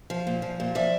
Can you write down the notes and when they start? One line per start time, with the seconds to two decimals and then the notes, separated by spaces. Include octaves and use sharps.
0.10 F3
0.27 A#2
0.42 F3
0.60 A#2
0.75 F3 D5 E5